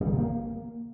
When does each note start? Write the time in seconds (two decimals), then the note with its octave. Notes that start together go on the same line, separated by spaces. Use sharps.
0.01 G3
0.07 D#3
0.13 C3
0.18 A#3